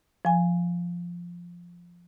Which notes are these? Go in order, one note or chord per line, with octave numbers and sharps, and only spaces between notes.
F3 G#5